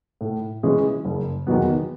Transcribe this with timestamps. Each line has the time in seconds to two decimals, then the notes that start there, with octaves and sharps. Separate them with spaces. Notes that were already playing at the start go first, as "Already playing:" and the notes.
0.21 A2
0.63 E3 G#3 C#4 G#4
1.05 F#1
1.47 E2 D#3 F#3 B3